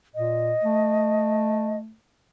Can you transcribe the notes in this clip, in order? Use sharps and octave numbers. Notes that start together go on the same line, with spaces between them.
A#2 D#5
A3